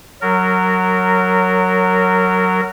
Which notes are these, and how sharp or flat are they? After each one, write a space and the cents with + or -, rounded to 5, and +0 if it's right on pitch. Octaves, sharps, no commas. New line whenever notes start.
F#3 +0 A#4 -20